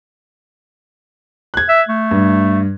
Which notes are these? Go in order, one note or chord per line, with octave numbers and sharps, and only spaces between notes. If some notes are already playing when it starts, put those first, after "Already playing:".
F#6 G#6
E5
A3
G2